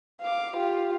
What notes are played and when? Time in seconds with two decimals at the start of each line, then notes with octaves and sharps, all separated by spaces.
0.21 F5 D6
0.56 F4 G4